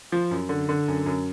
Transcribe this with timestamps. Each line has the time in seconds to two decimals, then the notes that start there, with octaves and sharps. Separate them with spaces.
0.12 F3
0.31 F#2
0.49 D3
0.69 D3
0.88 F#2
1.06 F#2